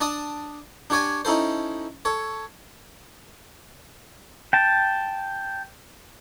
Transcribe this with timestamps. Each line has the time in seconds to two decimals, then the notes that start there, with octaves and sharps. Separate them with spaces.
0.01 D4 D5 A5 D#6
0.90 D4 G4 C#5 D5 G#5
1.25 C#4 D#4 E4 A4 C5
2.05 A4 C#5
4.53 G5 A5